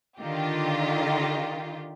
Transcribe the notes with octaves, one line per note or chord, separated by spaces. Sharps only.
D3 D#3 F4 G4